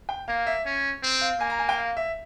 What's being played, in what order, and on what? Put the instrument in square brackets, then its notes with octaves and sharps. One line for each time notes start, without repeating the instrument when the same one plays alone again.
[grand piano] G5
[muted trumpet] A#3 [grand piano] F5
[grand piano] E5
[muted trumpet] C#4
C4
[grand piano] F5
[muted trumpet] A#3 [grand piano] G#5
[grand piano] A#5
G#5
G5
F5
E5